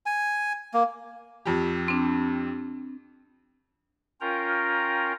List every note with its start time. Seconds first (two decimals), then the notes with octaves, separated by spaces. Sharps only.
0.06 G#5
0.74 A#3
1.46 F2 G4
1.88 C4 D4
4.21 C#4 F4 A#4 G5 A#5